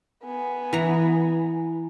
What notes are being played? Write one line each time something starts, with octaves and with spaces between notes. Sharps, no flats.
B3 G#5
E3 E4 A#5